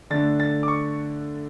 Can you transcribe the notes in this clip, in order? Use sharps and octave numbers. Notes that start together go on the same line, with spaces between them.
D3 A3 D4 A6
A6
D6
C#6